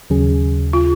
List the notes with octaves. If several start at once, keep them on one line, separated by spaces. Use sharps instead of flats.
D#2 C#3 F#3 C#4 G#4
F4